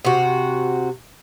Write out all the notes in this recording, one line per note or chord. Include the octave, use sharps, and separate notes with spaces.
C3 F#4